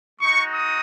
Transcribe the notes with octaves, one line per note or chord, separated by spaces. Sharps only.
G#3 D#4 F#4 C#6
D#6